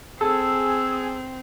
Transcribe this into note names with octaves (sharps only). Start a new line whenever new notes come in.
C4 G#4 A4 E6